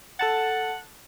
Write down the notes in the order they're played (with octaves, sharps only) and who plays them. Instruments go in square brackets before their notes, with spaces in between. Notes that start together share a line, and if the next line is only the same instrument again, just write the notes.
[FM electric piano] A4 A5 A6 [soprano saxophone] F#5